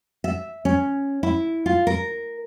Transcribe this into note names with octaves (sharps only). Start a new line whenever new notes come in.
E5
C#4
E4
F4
A#4